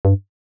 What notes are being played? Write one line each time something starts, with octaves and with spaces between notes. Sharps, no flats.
G2